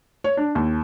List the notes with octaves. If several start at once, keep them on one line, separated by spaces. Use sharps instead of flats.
C#5
D4
D#2